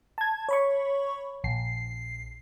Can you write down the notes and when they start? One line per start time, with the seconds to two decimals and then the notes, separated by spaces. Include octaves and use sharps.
0.18 A5 G#6
0.49 C#5 B5 C#6
1.44 A#1 C7